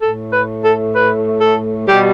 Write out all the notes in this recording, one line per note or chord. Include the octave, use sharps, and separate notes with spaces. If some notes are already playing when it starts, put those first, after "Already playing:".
A2 A3 A4
B4
A4
B4
A4
B2 G3 G4